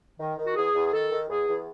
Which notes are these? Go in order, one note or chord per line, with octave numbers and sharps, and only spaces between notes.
D#3
D#3
F#4
E2 G#4
E2
G#4
D#3 A4
D#3
E2 G#4
E2